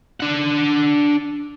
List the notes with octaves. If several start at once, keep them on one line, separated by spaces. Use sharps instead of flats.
D4 F#5